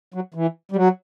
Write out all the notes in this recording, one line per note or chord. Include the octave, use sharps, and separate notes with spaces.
F#3
E3
G3
F#3